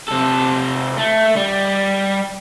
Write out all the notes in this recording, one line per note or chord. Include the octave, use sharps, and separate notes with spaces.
C3 A4
A3
G3